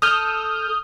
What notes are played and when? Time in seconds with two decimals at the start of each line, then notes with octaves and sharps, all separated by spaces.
0.02 A4 D#6 F6 G6